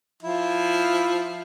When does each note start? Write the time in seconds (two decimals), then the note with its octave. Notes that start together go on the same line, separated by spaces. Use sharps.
0.23 F3 E4 F4